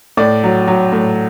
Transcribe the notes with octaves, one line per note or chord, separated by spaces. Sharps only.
A2 D5
F#3
F#3
A2